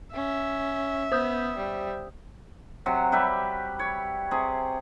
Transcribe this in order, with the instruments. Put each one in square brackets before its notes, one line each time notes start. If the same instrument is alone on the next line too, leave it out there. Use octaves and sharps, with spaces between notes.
[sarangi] C#4 [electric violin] E5
[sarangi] B3 [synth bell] C5 D#6 G6
[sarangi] G3
[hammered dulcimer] C3 F#3
G3 G4 B4 E5
C#5
C3 G#4